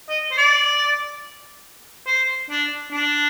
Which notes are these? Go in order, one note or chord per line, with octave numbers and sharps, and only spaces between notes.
D#5
C5
D5
C5
D4
D4